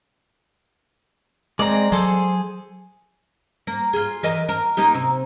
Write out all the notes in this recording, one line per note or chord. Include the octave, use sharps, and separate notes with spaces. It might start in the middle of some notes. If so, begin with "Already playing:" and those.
G#3 C4 D5 A#5
F#3 G#4 A4 C5
A#3
F4 G#4
E3 A#4 D#5
A#4
A#3 D#4 G4
C3